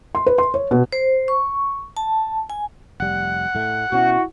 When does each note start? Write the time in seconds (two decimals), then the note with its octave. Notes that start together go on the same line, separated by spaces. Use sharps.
0.15 C6
0.26 B4
0.38 C6
0.54 C#5
0.71 B2
0.92 C5
1.28 C#6
1.97 A5
2.50 G#5
3.00 F1 G3 F#5
3.55 A2 A3
3.92 B2 C#4 E4 F#4